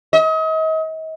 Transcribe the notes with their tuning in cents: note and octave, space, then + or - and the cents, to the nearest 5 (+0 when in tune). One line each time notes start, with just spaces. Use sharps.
D#5 +40